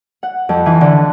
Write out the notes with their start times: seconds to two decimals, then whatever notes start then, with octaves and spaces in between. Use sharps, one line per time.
0.23 F#5
0.49 F2
0.66 E3
0.81 D3